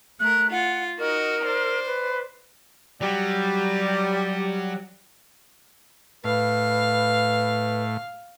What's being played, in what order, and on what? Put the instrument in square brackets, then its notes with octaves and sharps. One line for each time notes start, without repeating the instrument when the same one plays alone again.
[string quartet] A3 A#4 [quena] F#6
[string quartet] F4 [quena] F#5
[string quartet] D#4 F#4 D#5 [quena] A#4
[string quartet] C5 D5
[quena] B4
[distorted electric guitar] F#3 [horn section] G3
[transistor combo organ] A2 [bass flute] B4 [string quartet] F5